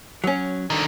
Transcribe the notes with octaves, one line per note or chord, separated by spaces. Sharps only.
F#3 C#4
D3 D#3